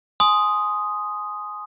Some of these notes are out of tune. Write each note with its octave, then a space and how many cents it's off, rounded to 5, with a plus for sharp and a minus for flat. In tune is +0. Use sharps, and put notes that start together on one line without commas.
G#5 +15 C6 +0 D#6 +0